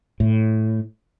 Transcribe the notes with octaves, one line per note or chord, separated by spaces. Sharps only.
A2